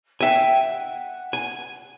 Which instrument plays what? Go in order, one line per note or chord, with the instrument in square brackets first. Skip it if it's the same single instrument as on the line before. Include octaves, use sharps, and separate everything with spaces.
[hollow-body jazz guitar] E5 G#5 [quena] G5
[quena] F#5
[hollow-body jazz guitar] G#5